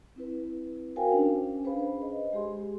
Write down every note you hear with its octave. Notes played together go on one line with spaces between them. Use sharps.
C4 E4 B4
F#4 A#4 C5 F5 G5 G#5
C#4 D4
G#4 B4 C5 F5 B5
D#5
G#3 G4 G#4 C6